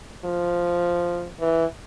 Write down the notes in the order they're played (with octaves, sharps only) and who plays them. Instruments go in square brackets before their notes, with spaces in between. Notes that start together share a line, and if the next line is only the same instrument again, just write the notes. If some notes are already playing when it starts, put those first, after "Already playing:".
[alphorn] F3
E3